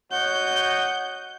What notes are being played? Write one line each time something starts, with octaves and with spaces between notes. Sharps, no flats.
F#4 C#5 D#5 F#5 G6